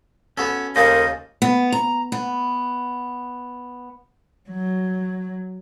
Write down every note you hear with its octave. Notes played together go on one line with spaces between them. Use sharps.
B3 C#4 F#4 A4
D#2 C#3 A4 A#4 C5 D#5
B3
A#5
B3
F#3